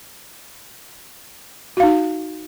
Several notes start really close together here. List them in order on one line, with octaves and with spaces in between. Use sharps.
F#4 F5 D#4